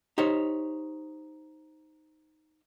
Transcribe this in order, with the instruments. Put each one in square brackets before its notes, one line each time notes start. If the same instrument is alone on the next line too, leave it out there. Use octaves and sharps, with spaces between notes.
[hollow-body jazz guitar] D#4 G4 C5 C#5